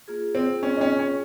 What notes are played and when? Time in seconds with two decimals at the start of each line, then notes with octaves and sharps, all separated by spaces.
0.08 A#3 F4 G#4
0.35 C4
0.63 C#4
0.77 D#4
0.81 C#4
0.99 C#4